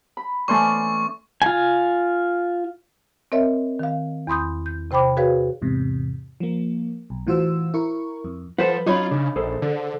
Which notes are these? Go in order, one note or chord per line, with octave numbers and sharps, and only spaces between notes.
B5
E3 A3 C#4 C5 D5 C#6
F4 G#5
C4 A#4 C#5 D#5 E5
D#3 F5
E2 B5 C6 D#6 G6
G6
C3 C5 G5 B5 D6
F#4 G#4 B4 C#5 F5
E2 G#2 C3
F3 A#3
B1
A2 E3 F4 F#4 C5 E6
E4 A#4 C#6
F2
F3 A4 B4 C5 F#5
F#3 C#4 D#4 F4 C#5 B5
C#3 D4
A#1 G#4 A4 C5
D3